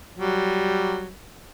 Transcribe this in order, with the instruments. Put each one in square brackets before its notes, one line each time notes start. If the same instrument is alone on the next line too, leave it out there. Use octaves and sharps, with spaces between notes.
[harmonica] F#3 G3